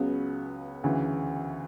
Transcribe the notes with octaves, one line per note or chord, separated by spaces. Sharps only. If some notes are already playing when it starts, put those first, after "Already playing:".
Already playing: C#2 C#3 F#3 B3
D2 C#3 E3